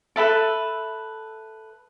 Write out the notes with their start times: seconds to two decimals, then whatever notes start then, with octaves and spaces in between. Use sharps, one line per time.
0.16 A4 B4 E5 A5